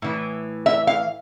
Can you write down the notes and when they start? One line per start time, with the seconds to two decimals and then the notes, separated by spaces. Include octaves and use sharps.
0.02 A2 E3
0.66 E5
0.87 F5